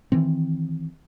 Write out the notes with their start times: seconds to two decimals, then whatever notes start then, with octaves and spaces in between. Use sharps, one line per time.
0.12 D#3 E3 C4